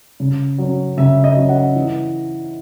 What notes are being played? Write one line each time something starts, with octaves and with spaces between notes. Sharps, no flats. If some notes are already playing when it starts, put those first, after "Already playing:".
C#3
F#3 C#4
C#3 E5
D#5
F#3 C#4
F#5
E3